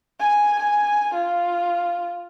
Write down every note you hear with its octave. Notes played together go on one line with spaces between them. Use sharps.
G#5
G#5
F4